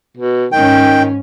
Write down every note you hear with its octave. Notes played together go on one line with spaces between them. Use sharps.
B2
G#2 D#3 C#4 G5